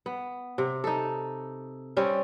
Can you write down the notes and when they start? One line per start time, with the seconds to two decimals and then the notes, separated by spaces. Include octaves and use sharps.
0.06 B3
0.58 C3
0.84 D#4 A4
1.97 G3 C4 C#4